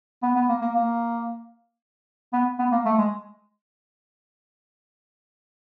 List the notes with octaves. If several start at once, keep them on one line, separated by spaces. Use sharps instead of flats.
B3
B3
A#3
A#3
A#3
B3
B3
A#3
A3
G#3